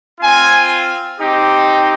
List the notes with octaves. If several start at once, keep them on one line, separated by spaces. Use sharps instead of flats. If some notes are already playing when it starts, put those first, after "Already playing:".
C4 F4 G#5
C4 D#4 G4